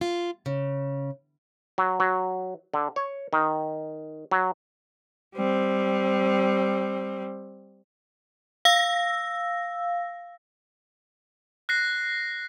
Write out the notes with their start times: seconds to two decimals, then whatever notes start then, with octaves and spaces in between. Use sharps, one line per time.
0.01 F4
0.46 C#3
1.78 F#3
2.00 F#3
2.74 D3
2.96 C#5
3.33 D#3
4.31 F#3
5.35 G3 C4
8.65 F5 E6 A#6
11.69 F#6 A#6 C7